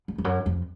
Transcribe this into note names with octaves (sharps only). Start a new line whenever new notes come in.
F2
F2
F#2
F2